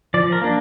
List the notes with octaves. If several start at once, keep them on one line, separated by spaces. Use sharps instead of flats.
F3 D5
A#4
A#3 D4